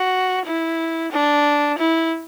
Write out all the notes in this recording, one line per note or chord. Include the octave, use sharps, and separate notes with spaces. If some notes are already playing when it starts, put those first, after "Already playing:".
Already playing: F#4
E4
D4
E4